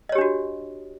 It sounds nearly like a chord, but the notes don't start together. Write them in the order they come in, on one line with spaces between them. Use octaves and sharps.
D#5 C#5 G4 D4 F#4